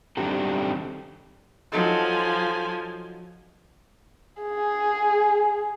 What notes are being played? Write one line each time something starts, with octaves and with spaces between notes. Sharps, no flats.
D#3 G3 C4 D4 G4 A4
F3 F#3 D#4 A4 G#5
G#4